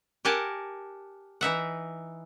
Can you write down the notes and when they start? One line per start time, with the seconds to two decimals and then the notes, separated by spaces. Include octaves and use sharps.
0.25 G4 A#4 F#5 G#5 A5
1.41 E3 D#4 E5 F#5